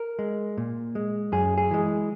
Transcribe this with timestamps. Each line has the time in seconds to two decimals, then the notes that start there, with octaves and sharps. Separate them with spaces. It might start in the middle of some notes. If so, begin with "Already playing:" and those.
Already playing: A#4
0.19 G#3
0.57 A#2
0.95 G#3
1.32 F#2 G#4
1.58 G#4
1.71 E3 G#3